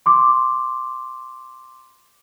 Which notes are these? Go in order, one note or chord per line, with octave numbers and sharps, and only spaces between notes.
C6 D6